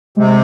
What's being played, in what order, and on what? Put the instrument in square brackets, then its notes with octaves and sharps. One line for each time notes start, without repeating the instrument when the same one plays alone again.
[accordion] C3 [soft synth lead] G#3